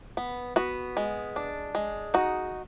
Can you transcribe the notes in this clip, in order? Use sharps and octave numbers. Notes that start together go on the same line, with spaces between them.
B3
B3 F#4
G#3
D4
G#3
D#4 F#4